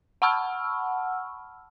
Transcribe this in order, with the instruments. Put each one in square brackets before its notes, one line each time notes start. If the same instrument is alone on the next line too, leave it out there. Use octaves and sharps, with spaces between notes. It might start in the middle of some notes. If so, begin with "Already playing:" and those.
[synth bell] F#5 A5 B5 C#6 E6 F6